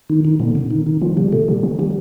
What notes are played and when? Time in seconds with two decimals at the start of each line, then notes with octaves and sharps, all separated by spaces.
0.10 D#3
0.25 D#3
0.39 A#2 D3
0.55 C3
0.71 D#3
0.86 D#3
1.01 D3 F3
1.17 C3 G3
1.32 A#2 A3
1.48 C3 G3
1.63 D#3
1.79 D#3 G3